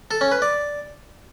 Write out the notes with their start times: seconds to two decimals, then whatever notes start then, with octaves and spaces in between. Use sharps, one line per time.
0.11 A4
0.21 C#4
0.32 B4
0.42 D5